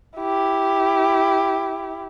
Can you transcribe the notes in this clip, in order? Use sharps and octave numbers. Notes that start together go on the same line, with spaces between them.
E4 G4